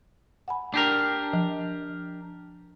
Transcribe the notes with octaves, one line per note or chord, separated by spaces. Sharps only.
F#5 G#5 B5
D4 G4 A#4
F3